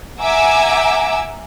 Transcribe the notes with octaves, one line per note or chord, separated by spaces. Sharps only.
E5 F#5 G#5 A#5 D6 E6